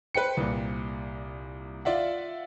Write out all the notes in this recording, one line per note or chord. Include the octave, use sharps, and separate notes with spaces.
B4 C5 G5 C#7
C2 A#2
F4 D5 E5 F#5